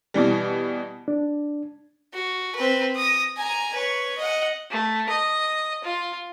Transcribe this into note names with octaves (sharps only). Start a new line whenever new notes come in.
B2 E3 G3
D4
F#4
C4 B4
D#6 A#6
G#5 A#5
B4 C#5
D#5 F#5
A3
D#5
F4